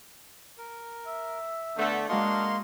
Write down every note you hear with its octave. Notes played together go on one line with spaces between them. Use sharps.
A#4
E5
D3 A3 B3
G#3 A#3 D4 F#4 D#5 F5 C6 C#6